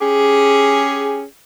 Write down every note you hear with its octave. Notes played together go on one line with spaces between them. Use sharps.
C#4 G4 G#4